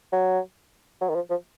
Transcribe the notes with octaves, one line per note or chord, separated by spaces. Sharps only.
F#3
F#3
D#3
F3
F3